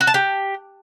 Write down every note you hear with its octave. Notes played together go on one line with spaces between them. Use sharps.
F#4
A5
G4